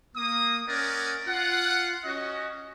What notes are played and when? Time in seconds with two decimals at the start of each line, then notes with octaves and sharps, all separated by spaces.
0.16 A#3 D#6
0.68 C#4 A#4 D5 D#5 F#5 G#5
1.27 F4 F#5
2.05 C#4 F#4 D#5